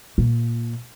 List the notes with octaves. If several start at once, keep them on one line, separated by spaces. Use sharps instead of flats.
A#2